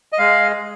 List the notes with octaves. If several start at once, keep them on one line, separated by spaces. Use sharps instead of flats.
D#5
G#3 F5